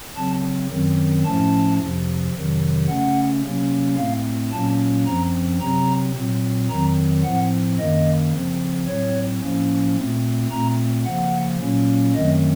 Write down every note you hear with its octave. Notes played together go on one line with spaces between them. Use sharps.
C#3 F#3 C4 A5
F#2 D#3 F#3 C4
A2 F3 A3 C#4 A5
F2 C3 F3
F2 C3 D#3 F#3
C#3 A3 C#4 F#5
C3 F#3 A#3 C#4
A2 A3 C4 F5
A#2 F#3 A#3 C#4 A5
F#2 F3 C4 A#5
C3 F#3 C4 A#5
A#2 F#3 C4
F2 D#3 F#3 C4 A#5
A2 F3 C4 F#5
F#2 D#3 A#3 D#5
C#3 F3 C4
A2 F#3 C4 C#5
A2 F3 A#3 C#4
A#2 A3 C4
A#2 A3 C4 A#5
C#3 F3 A#3 F#5
A#2 F#3 A#3 C#4
F#2 D#3 F#3 A3 C4 D#5